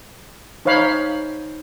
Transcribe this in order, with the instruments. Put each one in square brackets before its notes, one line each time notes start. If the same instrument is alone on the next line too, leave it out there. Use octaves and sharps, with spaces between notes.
[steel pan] D#4 C5 C#5 F5 B5